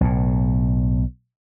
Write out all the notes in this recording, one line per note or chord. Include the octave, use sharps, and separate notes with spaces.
B1 A2